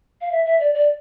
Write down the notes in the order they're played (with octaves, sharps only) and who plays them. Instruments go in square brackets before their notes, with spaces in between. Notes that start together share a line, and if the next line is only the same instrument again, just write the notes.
[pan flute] F5
E5
E5
D5
D5